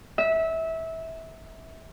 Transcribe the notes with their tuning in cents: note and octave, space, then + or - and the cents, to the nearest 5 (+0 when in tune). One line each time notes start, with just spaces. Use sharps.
E5 -20